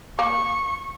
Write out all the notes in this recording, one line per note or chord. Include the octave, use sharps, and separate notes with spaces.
A#3 C#6